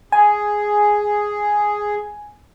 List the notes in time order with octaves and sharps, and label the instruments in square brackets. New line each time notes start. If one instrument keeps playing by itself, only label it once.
[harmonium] G#4 [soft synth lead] G#5